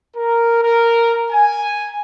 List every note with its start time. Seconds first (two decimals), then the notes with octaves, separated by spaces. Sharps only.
0.16 A#4
0.63 A#4
1.32 G#5